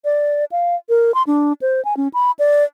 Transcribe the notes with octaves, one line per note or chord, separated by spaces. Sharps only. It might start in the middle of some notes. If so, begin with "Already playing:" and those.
D5
F5
A#4
C6
D4
C5
G#5
C#4
B5
D5